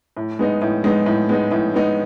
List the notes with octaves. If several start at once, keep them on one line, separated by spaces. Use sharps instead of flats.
A2
G#3 B3 D#4
A2
G#3 B3 D#4
A2
G#3 B3 D#4
A2
G#3 B3 D#4